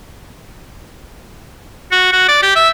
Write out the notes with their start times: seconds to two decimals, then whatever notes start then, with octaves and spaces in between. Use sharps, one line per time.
1.92 F#4
2.12 F#4
2.28 D5
2.43 G4
2.55 E5